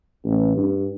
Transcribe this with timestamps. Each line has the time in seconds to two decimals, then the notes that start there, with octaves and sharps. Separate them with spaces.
0.24 A1
0.57 G2